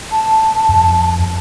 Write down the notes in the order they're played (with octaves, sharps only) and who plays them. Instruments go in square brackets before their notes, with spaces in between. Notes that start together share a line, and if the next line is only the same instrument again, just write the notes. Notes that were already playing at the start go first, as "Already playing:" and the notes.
[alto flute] A5
[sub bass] F2